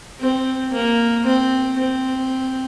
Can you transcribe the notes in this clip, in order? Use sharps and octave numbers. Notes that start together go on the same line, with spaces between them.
C4
A#3
C4
C4